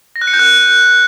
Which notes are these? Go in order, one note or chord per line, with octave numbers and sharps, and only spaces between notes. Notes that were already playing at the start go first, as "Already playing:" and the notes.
A#6
F#6
C#7
G6
F#6